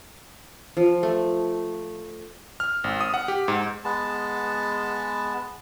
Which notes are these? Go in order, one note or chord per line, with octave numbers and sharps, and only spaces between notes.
F3
A3
F6
G#1
D#6
F#5
G4
G#2
G#3 B3 A5